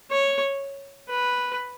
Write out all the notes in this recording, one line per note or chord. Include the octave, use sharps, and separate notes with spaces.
C#5
B4